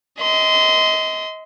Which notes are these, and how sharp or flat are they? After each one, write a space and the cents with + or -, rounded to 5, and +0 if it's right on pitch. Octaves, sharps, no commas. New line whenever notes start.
D#5 +30 C6 -20